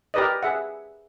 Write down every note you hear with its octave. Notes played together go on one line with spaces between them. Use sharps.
G4 A#4 B4 D5 D#5
G#4 E5 F#5